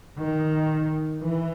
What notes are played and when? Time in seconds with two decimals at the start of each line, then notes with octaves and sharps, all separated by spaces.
0.19 D#3
1.20 E3